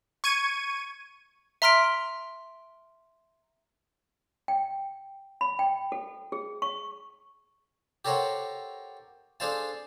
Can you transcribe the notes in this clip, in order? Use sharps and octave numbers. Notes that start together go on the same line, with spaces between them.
C#6 G#6 D#7
E5 A#5 C6 F6 B6 D7
G5
B5
G5
A4
G#4
C#6
G4 A4 A#4 C5 C#5 F#5
D4 G#4 A4 C5 F5 A5